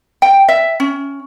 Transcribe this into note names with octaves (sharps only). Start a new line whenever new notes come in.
G5
E5
C#4